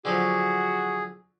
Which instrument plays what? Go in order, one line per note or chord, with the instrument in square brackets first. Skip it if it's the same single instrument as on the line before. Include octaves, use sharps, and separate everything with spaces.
[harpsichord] D3 F3 F#3 [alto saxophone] F#4 [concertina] G#4